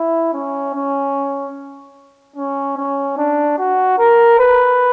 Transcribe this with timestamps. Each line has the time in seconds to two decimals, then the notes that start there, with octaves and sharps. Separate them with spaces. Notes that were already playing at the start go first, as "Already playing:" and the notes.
Already playing: E4
0.34 C#4
0.74 C#4
2.36 C#4
2.77 C#4
3.17 D4
3.58 F#4
3.99 A#4
4.39 B4